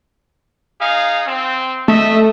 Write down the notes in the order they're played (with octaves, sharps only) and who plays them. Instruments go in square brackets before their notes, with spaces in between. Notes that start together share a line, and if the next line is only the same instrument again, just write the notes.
[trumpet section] D#4 G#4 F5
C4
[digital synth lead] A3 [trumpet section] D#5 E5